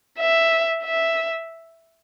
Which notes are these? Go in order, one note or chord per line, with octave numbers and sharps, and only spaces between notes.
E5
E5